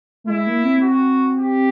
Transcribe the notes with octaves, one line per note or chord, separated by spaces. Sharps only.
A3
G#3 E4
A#3
C4
F#4
G4